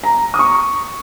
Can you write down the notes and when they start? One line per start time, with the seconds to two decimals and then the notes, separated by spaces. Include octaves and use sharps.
0.04 A#5
0.34 D#6
0.39 C#6